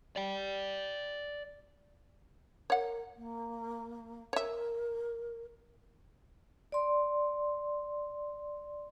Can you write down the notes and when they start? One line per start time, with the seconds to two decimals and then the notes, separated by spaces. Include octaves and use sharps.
0.16 D5 G5
2.70 A#4 C#5 F#5
3.16 A#3
4.33 A#4 C#5 E5
6.72 D5 C6